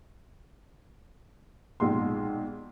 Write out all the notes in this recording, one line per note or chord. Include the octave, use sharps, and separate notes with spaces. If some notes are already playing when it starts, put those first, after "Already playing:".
A#1 G#2 B2 C6